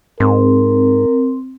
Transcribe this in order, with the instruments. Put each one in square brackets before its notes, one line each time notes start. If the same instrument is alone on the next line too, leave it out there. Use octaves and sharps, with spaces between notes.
[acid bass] G#2 [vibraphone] C4 [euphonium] A#4